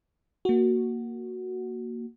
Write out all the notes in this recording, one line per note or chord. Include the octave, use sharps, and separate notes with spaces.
A#3 F#4